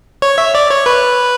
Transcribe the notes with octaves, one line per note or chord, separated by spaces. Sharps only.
C#5
E5
D5
C#5
B4